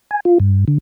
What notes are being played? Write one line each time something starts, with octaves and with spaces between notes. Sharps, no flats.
G#5
F4
G2
D3